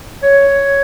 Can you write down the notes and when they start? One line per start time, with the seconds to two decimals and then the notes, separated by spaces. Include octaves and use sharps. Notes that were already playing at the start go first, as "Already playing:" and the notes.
0.23 C#5